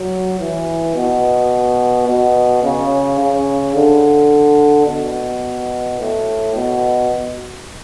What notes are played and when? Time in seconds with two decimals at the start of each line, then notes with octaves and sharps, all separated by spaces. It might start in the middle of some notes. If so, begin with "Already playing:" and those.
Already playing: F#3
0.39 E3
0.95 B2
2.07 B2
2.63 C#3
3.19 C#3
3.75 D3
4.86 B2
5.99 A2
6.54 B2